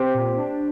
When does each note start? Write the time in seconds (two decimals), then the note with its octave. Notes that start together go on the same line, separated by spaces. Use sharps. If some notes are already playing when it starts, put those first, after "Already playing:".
Already playing: C4 G4 C5
0.14 A#2
0.37 D4